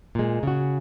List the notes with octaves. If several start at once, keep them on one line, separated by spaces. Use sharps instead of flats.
A#2 G#3
C#3 F#4